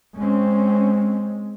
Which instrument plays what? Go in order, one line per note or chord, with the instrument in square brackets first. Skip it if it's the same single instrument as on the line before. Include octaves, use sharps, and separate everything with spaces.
[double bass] G#3 [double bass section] C4 C#4